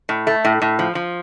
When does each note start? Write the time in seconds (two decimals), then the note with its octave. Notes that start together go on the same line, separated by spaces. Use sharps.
0.09 A2
0.27 A3
0.44 A2
0.62 A2
0.79 F3
0.95 F3